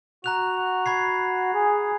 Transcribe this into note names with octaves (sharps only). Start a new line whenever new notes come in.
F#4 A#5 F#6 F7
B5 G#6 C7
G#4